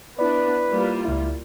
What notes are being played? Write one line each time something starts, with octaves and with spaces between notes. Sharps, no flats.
B3 D4 E4 B4 D5
G3 A#3 F4
C#2 E4